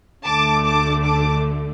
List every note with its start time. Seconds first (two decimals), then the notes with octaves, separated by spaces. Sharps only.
0.24 D2 D3 A3 A5 D6
0.65 A5 D6
1.04 A5 D6